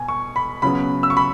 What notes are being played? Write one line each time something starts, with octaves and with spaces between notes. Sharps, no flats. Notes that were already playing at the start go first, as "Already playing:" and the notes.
Already playing: B2 G#5
C#6
B5
C#3 F#3 B3 B5
E6
C#6
B5